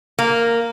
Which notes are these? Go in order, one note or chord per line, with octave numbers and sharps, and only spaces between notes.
A#3